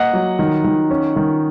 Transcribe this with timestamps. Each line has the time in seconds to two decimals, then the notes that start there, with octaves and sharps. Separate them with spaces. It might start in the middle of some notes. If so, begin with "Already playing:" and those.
Already playing: A#3 D#5 F#5
0.13 F#3
0.39 D#3
0.64 D#3
0.90 C#4
1.16 D#3